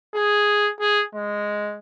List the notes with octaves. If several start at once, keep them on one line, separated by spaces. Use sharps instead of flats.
G#4
G#4
G#3